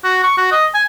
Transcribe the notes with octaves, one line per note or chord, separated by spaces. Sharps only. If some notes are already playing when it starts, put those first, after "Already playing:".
F#4
C#6
F#4
D#5
G#5